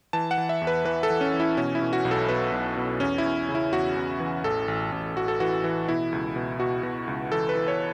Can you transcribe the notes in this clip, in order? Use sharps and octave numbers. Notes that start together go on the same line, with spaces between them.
E3 A5
F#5
E3
E5
E2
B4
E3 B4
A4
E3
C#4
E3
E4
B2 C#4
E4
B2
F#4
B1
A4
B2 B4
B1
B2
E2 C#4
E4
E2
C#3
E4
E2 F#4
E2
E3
A1 A4
A1
A1
A1 F#4
A4
E3 F#4
E3
B2 E4
C#2
B2
B2 F#4
B2
C#2
E3 A4
B4
E3
C#5